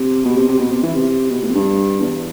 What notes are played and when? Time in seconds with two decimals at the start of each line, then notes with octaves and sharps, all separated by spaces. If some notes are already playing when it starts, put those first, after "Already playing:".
Already playing: C3
0.25 B2
0.37 C3
0.49 C3
0.60 B2
0.71 C3
0.83 E3
0.95 C3
1.31 B2
1.42 A2
1.49 F2
1.55 G2
2.01 E2